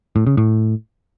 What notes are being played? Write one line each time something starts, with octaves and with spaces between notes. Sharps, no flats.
A2
C#3
A2